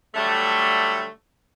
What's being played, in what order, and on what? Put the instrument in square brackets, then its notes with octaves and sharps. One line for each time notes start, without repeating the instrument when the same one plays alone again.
[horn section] D3 F#3 G3 A3